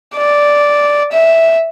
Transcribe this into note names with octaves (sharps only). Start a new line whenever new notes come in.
D5
E5